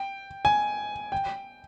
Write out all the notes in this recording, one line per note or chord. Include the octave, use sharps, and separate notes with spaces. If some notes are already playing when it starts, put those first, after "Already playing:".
Already playing: G5
G#5
G5